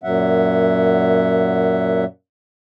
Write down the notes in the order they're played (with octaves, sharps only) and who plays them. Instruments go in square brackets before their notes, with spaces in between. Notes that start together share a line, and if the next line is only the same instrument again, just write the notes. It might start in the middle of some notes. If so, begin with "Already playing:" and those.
[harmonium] F#2 A#2 F#3 E5 F#5